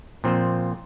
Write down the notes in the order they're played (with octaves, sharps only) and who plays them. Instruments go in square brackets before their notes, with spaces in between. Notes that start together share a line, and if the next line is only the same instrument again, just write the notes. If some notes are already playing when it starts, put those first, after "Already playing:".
[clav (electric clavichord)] A#2 F3 C4 F4 C5